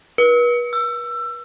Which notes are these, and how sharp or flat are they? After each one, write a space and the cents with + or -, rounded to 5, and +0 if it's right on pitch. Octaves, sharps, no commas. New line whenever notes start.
B4 -40
E6 +25